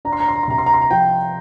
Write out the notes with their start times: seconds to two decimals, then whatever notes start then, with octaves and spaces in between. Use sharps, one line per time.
0.05 D4 A#5
0.13 C6
0.20 A#5
0.28 C6
0.35 A#5
0.43 C6
0.48 C3 A#5
0.58 C6
0.66 A#5
0.74 C6
0.81 A#5
0.91 F3 G5